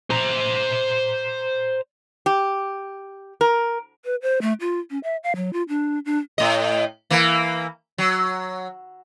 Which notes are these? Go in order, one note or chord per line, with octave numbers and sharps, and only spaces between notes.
C5 A#5
G4
A#4
B4
C5
A3
F4
C#4
E5
F5
F#3
F4
D4
D4
A2 D#5
E3 A#3
F#3